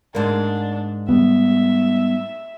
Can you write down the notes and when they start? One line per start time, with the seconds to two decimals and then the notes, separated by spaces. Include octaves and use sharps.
0.15 G#2 A#3 D4
1.09 G3 B3 E5